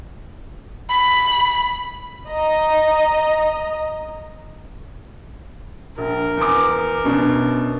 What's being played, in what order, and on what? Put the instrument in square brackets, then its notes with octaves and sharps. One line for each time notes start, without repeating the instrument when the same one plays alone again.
[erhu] B5
[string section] D#5 A#5
[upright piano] A#1 [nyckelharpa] A#4
[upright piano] E2 D6
F#2 B2 D4